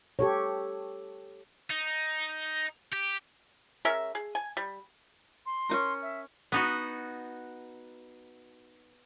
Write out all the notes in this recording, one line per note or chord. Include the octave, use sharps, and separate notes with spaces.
G4 A4 C#5
D#4
G4
G#3 C#4 A#4 E5
G#4
G#5
G3
C6
C#4 D#4 A#4
E5
B3 D#4 F#4